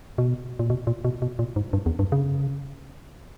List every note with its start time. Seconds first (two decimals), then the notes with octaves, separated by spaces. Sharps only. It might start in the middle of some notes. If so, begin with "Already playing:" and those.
0.18 B2
0.59 A#2
0.70 B2
0.87 A#2
1.05 B2
1.22 B2
1.39 A#2
1.56 G#2
1.73 G2
1.86 E2
1.99 G2
2.12 C#3